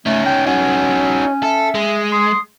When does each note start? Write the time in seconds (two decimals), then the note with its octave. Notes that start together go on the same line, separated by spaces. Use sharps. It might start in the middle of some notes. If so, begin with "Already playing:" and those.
0.06 A3 C#4 D#4 C#5
0.26 G5
0.47 C#4 D#4 F#4
1.43 A4 E5
1.75 G#3
2.12 C6 D#6